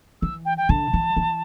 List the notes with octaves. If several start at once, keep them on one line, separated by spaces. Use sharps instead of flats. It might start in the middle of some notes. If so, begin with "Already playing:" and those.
E3 E6
G5
G5
D3 A5
E3
E3